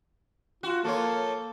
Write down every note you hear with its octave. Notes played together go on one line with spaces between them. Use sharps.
F4 F#4
F3 A#3 A4 C#5